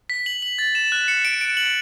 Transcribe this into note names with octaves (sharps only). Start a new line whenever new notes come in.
B6
F#7
F#7
A6
E7
F#6
C#7
D7
D7
F#7